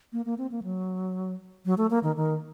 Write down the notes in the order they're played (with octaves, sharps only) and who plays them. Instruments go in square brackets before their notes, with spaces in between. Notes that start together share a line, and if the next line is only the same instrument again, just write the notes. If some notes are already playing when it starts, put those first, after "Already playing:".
[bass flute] A#3
A#3
C4
A#3
F#3
F#3
A3
A#3
D#3
D#3